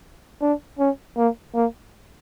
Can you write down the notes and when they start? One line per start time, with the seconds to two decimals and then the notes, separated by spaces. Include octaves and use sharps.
0.42 D4
0.79 C#4
1.17 A#3
1.55 A#3